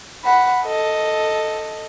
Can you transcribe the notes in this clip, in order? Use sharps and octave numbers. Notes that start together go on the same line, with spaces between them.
F#5 B5
A4 D#5